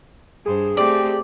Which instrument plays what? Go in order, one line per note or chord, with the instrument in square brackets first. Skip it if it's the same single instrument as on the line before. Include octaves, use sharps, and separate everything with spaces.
[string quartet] G2 C5 [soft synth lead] G#4
[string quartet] A3 C4 [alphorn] G4 [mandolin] D5